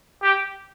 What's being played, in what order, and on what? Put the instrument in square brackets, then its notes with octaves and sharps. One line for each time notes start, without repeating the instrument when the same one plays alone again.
[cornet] G4